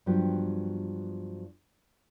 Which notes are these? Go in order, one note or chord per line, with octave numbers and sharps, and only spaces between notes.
G2 F3 F#3 B3 G4